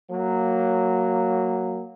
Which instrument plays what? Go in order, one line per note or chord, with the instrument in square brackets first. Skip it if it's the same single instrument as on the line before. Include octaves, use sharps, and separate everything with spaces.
[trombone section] F#3 A#3